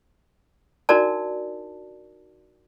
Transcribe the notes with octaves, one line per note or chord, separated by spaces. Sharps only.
D4 D#4 F#4 A#4 D5 A5